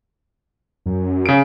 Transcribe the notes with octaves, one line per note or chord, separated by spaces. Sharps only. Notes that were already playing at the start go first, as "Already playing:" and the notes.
F#2
C#3 D7